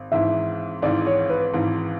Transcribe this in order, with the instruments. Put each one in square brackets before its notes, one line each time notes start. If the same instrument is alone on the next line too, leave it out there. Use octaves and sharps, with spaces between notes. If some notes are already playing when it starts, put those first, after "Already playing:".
Already playing: [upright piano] G#1
[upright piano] G#1 G#2 E3 [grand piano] E5
[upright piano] G#1 G#2 E3 [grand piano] D5
[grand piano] C#5
B4
[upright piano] G#1 G#2 E3